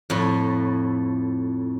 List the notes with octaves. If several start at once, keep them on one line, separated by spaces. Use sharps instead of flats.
F2 A2